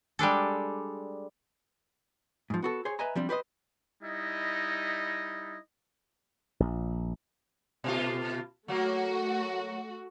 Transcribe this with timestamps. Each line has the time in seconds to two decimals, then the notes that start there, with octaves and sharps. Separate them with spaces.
0.19 G3 G#3 D4 A4
2.50 G#2 F3
2.62 B3 F#4 A4
2.85 G#4 C5 C#5 G#5
2.99 B4 D#5 E5 G#5 A#5
3.15 F3 G3 C4 D4
3.29 G4 B4 C5 D#5
4.03 G3 D#4 E4 D#5
6.60 A#1
7.84 B2 A3 F4
8.68 F#3 A3 A#3 F#4